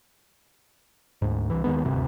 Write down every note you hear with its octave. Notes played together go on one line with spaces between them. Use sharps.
D2 G#2
C2 E3
D#2 D#3 G#3 B3
D#1 D2 G2 C3